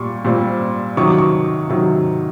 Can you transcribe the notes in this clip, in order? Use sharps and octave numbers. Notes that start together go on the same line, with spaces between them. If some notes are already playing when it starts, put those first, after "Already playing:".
Already playing: A#2 G3 C#6
A#2 G3 C4
C3 D#3 F#3 C#6
D6
C#6
C3 D#3 F#3